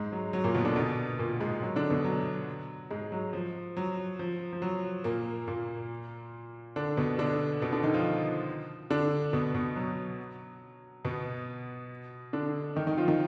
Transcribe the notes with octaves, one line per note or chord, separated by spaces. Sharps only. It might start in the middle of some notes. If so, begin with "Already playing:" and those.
Already playing: G#2 G#3
F#3
F#3
A#2 A#3
B2 B3
D3 D4
B2 B3
A#2 A#3
G#2 G#3
F#3
D3 D4
B2 B3
F#3
G#2 G#3
F#3
F3
F#3
F3
F3
F#3
A#2 A#3
A#2 A#3
D3 D4
B2 B3
D3 D4
B2 B3
D3 D4
D#3 D#4
F3 F4
D3 D4
B2 B3
B2 B3
F#3
B2 B3
D3 D4
D#3 D#4
D#3 D#4
F3 F4
D#3 D#4